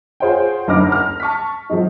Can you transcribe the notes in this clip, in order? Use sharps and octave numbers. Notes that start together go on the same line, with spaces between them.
F4 G#4 C5 C#5 F#5 G5
F#1 D2 D#4 D6 F6 A#6
F6
A5 C#6 F6 B6
D#3 F3 F#3 G#3 D#4